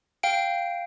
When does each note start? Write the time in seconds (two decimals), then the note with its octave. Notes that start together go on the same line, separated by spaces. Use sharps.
0.23 F5 G5 D7